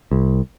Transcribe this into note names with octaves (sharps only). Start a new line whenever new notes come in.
C2